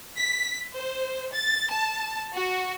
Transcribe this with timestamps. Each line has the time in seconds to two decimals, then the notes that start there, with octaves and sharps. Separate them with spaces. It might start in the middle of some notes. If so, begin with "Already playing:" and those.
0.16 B6
0.73 C5
1.32 A6
1.70 A5
2.33 F#4